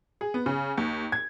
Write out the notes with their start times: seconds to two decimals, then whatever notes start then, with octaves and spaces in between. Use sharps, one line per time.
0.21 G#4
0.34 B3
0.46 C#3
0.77 D#2
1.12 G#6